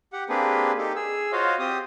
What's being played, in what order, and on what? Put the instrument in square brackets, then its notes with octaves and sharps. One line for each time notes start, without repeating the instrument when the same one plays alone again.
[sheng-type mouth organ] G4 F#5
A#3 C4 D4 G4 G#4 B4
D#4 G4 A4
G#4 E6
F4 F#4 C5 C#5 D#5 F5
C4 G4 C5 D#6